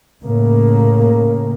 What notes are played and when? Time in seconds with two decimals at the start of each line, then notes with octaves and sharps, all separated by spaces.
0.24 A2 C#3 A#3